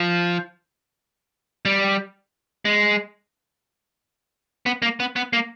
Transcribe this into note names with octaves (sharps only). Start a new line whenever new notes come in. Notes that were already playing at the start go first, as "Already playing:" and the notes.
Already playing: F3
G3
G#3
B3
A#3
B3
B3
A#3